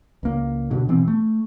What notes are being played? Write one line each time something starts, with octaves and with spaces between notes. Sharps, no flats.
C#2 A#3
C#2 G2 B2 D3
B2 E3 B3 C4
A3